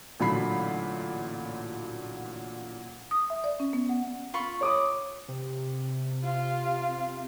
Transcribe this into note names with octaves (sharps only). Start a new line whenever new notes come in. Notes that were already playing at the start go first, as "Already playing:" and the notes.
A1 A#2 D3 F#3 B5 C7
D#6
E5
D5
C#4
B3
F#5
F4 B5 C#6
C#5 D6 D#6
C3
F4